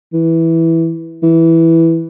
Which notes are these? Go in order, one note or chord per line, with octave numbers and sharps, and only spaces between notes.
E3
E3